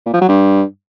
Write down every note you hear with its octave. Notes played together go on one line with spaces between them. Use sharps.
A#2
F3
F#3
G2